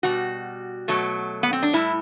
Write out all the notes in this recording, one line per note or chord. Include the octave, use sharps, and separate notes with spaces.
B2 G3 F#4
B2 F#3 A3
B3
C4
D4
A2 G3 E4